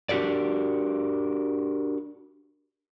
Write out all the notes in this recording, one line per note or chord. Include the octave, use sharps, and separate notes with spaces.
D4 F#4 G4 A#4 D5